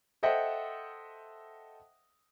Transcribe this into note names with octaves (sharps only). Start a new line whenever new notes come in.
A4 C5 D#5 E5 F#5 G5